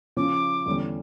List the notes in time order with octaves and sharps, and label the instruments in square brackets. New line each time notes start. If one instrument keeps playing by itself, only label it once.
[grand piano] C#3 F3 C#4 [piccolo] D6
[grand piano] E2 D3 G3 C#4